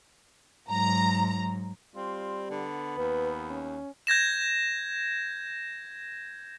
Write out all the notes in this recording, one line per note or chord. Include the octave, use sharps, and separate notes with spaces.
G#2 F#3 A#5
G3 C4 F4
D3 B3
D#2 B4
C#4
G6 G#6 A#6 E7